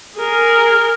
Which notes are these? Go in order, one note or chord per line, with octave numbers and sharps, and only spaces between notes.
G#4 A#4